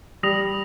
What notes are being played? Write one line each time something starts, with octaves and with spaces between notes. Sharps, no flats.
G3 D#6 A#6 F7